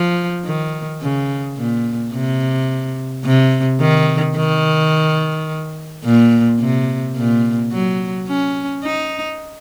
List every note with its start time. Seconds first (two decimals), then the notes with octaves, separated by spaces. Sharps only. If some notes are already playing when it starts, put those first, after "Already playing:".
Already playing: F3
0.45 D#3
1.01 C#3
1.57 A#2
2.13 C3
3.24 C3
3.80 D#3
4.37 D#3
6.04 A#2
6.60 C3
7.16 A#2
7.72 F#3
8.28 C#4
8.83 D#4